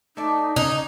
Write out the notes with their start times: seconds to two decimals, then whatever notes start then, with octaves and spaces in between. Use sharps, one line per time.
0.17 A3 D#4 D5
0.56 C#3 C#4 D#4 A#5